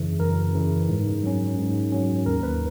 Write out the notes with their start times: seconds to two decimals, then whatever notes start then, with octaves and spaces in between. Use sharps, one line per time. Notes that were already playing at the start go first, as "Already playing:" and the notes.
Already playing: F#2 C#3 E3
0.20 F#2 A#4
0.54 C#3 E3
0.89 G#2
1.23 F#3 C#4
1.58 G#2
1.92 F#3 C#4
2.26 D#2 A#4
2.43 B4